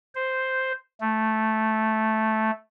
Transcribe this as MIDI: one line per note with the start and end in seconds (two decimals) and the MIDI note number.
0.15 0.72 72
1.01 2.51 57